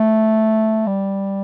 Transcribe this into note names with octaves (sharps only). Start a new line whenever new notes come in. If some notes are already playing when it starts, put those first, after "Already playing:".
Already playing: A3
G3